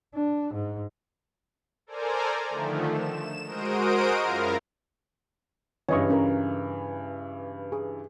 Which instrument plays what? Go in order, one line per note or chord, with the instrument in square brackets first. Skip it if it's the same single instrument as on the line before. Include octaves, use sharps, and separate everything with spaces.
[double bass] D4
G#2
[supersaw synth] A4 A#4 C5 D5 G#5 A#5
D3 D#3 F3 A3
E7
G#3 F#4 A#4 C5 D#6 D7
F#2 E4 F4 A#4 F5 A#5
[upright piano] G2 C#3 E3 [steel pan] C#5 D#5 C#6
[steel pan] C#4 A#4
G#4